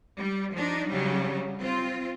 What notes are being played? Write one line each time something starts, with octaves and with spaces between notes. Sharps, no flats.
G3
F3 D4 D#4
C#3 F#3 G3
C4 F4